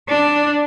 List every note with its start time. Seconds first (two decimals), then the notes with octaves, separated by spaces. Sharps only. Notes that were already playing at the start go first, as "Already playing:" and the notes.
0.08 D4